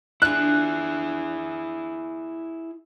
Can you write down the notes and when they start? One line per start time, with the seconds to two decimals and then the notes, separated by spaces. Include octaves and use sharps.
0.22 D4 E4 F4 G#4 F#6